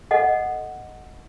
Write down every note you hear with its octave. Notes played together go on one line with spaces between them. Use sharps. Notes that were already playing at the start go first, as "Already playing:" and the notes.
A4 D#5 F#5